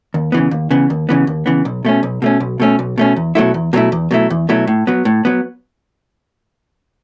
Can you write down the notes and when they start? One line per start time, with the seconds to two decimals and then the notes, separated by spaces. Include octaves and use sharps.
0.14 D#2
0.32 C#3 E3 B3
0.51 D#2
0.71 C#3 E3 B3
0.90 D#2
1.09 C#3 E3 B3
1.27 D#2
1.46 C#3 E3 B3
1.65 B1
1.85 B2 A3 C#4
2.03 B1
2.22 B2 A3 C#4
2.40 B1
2.60 B2 A3 C#4
2.79 B1
2.98 B2 A3 C#4
3.16 E2
3.35 B2 F#3 A3 E4
3.54 E2
3.73 B2 F#3 A3 E4
3.92 E2
4.11 B2 F#3 A3 E4
4.30 E2
4.49 B2 F#3 A3 E4
4.67 A2
4.87 F#3 B3
5.05 A2
5.25 F#3 B3